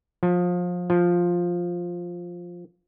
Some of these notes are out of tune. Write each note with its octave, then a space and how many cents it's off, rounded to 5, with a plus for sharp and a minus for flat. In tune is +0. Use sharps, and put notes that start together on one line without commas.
F3 +25
F3 +5